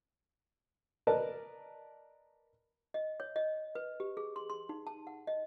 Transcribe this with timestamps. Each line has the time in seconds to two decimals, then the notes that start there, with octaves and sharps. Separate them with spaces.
1.07 A#4 B4 D5 D#5 A5
2.94 D#5
3.20 C#5
3.36 D#5
3.75 B4
4.00 G4
4.17 G#4
4.36 C6
4.50 C6
4.69 D#4
4.87 A5
5.07 F#5
5.27 D#5